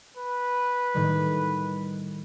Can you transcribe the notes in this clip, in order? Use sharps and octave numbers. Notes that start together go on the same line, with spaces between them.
B4
A2 D#3 G3